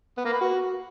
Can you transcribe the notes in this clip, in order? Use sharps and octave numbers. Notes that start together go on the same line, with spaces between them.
B3
A#3
B4
F#4